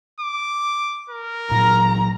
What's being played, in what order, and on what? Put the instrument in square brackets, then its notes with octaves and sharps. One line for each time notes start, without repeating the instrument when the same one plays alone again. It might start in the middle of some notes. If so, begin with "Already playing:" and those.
[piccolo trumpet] D6
A#4
[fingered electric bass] A#2 F#3 [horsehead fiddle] A#5